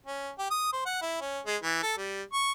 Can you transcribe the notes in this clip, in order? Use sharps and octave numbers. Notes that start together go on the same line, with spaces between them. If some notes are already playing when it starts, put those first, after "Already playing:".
C#4
G4
D#6
C5
F#5
E4
C#4
G#3
E3
A4
G3
C#6